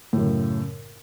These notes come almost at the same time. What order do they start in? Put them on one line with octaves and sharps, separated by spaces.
A2 F#2 C#3